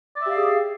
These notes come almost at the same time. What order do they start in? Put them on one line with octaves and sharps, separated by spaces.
D5 E5 G4 F5 G#4